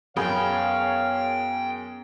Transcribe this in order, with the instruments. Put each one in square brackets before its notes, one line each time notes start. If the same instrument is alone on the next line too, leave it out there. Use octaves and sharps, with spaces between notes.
[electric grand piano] F#2 G#4 A#4 [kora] B3 [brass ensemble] C#5 F5 [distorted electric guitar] G5